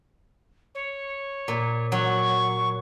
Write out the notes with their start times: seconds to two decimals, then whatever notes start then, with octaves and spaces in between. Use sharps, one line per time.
0.74 C#5
1.48 A#2
1.92 F#3 C#6